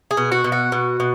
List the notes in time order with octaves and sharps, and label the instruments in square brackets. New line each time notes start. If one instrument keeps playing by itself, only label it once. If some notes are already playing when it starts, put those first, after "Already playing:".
[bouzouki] G#4
B2
F#4
B2
F#4
B2
B2